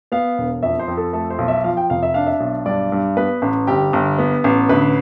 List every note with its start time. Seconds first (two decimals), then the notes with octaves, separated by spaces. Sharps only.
0.12 B3 F5
0.38 E1
0.62 F2 E5
0.79 C5
0.88 F2
0.97 A4
1.13 A3 A4
1.30 C5
1.38 B1
1.48 E5
1.64 F3 F5
1.77 G5
1.90 F1 F5
2.03 E5
2.14 D4 F5
2.27 E5
2.40 B1
2.65 G2 D5
2.92 G2
3.17 B3 B4
3.42 A1
3.67 G1 G4
3.93 G1
4.18 B3
4.44 A1
4.69 D2 B4